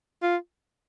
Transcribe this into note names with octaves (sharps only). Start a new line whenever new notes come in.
F4